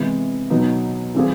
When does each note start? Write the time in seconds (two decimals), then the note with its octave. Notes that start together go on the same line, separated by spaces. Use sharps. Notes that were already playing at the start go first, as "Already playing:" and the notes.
Already playing: C3 E3 G#3 B3
0.50 B2 F#3 B3 D#4
1.15 E3 G3 C4 F4 G#4